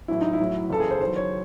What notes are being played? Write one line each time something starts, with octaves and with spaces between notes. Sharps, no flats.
A1 A2 F#3 E4
D#4
E4
A1 A2 F#3
F#1 E2 C#3 A4
G#4
C5
E2 D#3 F#3 C5
C#5